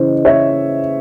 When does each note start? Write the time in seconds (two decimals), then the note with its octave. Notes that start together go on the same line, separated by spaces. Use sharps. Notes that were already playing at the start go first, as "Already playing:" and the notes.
Already playing: C#3 E3 C5 D#5
0.25 C#5 E5